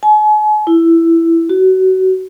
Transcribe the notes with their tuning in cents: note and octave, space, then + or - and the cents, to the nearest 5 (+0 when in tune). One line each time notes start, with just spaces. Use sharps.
G#5 +40
E4 +10
F#4 +25